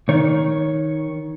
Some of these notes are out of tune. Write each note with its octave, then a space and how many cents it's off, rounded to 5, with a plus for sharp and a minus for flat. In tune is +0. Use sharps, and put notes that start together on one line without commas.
D#3 +10 C#5 +0